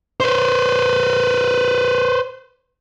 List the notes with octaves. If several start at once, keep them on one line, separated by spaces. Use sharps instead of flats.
B4 C5